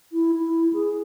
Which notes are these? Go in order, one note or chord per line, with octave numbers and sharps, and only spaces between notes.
E4
E4
G#4